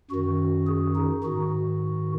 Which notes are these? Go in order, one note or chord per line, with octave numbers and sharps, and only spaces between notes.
F#2 D#3 F#4
G#4
D#4
G#2 D#3 F#4